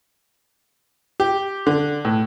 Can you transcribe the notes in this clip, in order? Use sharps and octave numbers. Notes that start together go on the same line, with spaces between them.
G4
D3
A2